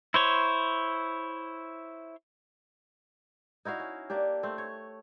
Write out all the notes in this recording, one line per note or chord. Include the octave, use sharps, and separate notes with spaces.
E4 C5 C#5
D#4 E4 F#4 F5
C#4
A#3 D4 G4
A3 C4
C#5